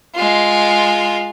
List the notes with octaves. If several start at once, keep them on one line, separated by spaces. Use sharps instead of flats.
G#3 F4